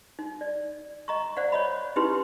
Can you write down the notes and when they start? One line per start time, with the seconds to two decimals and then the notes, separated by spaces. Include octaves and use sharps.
0.19 D#4
0.41 D5
1.08 D#5 A#5 C#6
1.37 C5 D5 F5 F#5
1.52 C#5 D#5 B5
1.96 C#4 D#4 E4 G4 B4 C6